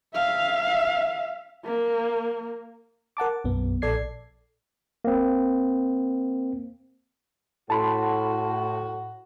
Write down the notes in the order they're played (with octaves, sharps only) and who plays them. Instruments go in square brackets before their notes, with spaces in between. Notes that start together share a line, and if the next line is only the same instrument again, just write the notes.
[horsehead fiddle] E5 F5
A#3
[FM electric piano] A#4 F#5 A5 D6
B1 F#2 B3
A#1 A4 D5 G#6 C7
[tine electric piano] A#3 C4
[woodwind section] A2 [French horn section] F#4 [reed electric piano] A5 B5 C6